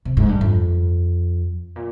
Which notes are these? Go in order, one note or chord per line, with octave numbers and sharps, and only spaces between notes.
C3
G#2
G2
F2
A#2